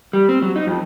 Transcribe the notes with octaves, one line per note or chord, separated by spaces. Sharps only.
G3
C4
F#3
D#4
F2